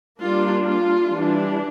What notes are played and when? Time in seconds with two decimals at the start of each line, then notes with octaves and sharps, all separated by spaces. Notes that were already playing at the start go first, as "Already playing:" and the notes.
0.22 G3 A#3 D4 F4
0.66 F4
1.10 E3 G3 D4